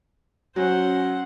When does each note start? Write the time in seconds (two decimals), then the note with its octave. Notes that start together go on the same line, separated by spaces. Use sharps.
0.56 F#3 C#4 C5 F#5